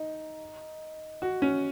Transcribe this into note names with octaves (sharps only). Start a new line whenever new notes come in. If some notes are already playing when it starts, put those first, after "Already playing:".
Already playing: D#4
F#4
C#4